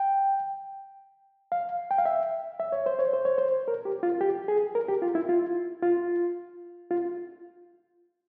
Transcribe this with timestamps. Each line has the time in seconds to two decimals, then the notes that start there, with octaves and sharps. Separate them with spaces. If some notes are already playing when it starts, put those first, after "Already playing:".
Already playing: G5
1.52 F5
1.91 G5
1.98 F5
2.06 E5
2.60 E5
2.72 C#5
2.86 C5
2.99 C#5
3.13 C5
3.25 C#5
3.38 C5
3.68 A#4
3.85 G4
4.03 F4
4.21 G4
4.48 G#4
4.75 A#4
4.88 G4
5.02 F4
5.15 E4
5.29 F4
5.82 F4
6.91 F4